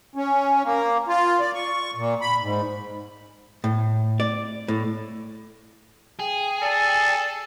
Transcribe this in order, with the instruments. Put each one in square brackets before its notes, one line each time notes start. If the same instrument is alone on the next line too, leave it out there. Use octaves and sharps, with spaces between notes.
[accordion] C#4
A#3
F4
D5
C#6
A#2
B5
G#2
[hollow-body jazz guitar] A2
D5
A2
[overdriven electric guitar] G#4 [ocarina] G5
[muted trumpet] A4 [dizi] D5